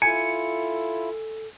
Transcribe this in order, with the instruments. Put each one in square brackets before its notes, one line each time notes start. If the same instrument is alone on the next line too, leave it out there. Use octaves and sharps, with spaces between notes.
[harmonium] E4 F4 [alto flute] A4 [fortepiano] G#5 [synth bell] C#7